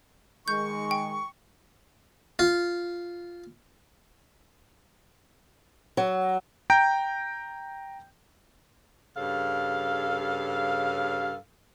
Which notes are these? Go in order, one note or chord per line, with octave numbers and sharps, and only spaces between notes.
D#3 G#3 C#6 G6
G5
F4
F#3
G5 A#5 G6 D7
G2 C#3 A4 F5